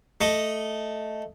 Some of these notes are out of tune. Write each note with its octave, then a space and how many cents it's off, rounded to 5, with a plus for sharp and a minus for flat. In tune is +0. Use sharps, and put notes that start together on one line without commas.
A3 +0 D#5 +0